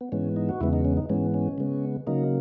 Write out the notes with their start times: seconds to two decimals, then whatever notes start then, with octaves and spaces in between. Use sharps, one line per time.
0.01 B3
0.12 G#2 E3 G#3 B3 C#4
0.36 D#4
0.49 F#4
0.60 E2 C#3 G#3 B3 E4
0.73 D#4
0.85 C#4
0.97 D#4
1.09 G#2 E3 G#3 B3 C#4
1.34 C#4
1.58 C#3 G#3 B3
2.07 C#3 F#3 A#3 D#4